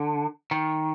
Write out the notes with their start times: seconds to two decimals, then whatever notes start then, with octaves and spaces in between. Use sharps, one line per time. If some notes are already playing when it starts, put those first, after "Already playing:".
Already playing: D3
0.51 D#3